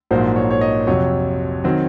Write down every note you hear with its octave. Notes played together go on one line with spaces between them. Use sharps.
A#1 G#2 F#3 A#3 C5
C#5
C#5
D#5
F2 C3 F#3 C#5
D#3 F#3 C4